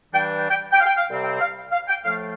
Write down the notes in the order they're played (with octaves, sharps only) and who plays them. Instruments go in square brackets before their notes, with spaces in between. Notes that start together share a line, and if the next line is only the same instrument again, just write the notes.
[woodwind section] G2 E3 G3 D4 G5
G5
G5
G5
F5
G5
F5
C2 C3 G3 C4
G5
F5
F5
G5
A2 F3 A3 F5